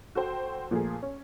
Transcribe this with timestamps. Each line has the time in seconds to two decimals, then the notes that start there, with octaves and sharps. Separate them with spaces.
0.15 F#4 A4 C5 G5
0.71 A#2 F3 A3 A#3 G#4
1.03 C#4